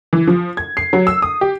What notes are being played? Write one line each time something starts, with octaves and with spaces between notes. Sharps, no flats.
E3
F3
G#6
C7
F#3
E6
D#6
G4